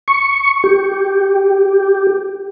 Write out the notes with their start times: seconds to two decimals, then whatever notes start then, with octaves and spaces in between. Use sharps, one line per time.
0.08 C#6
0.64 G4